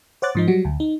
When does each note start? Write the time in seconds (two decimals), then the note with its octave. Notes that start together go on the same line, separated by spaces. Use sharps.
0.22 C5 C#5 F#5 D6 F#6 A6
0.35 G#2 F3 D#4
0.48 F#3 G3 F#4
0.65 D2
0.80 D#4